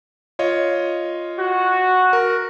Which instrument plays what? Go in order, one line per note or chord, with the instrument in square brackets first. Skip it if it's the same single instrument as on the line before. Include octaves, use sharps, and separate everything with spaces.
[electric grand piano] F4 C#5 D#5
[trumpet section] F#4
[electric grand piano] A#4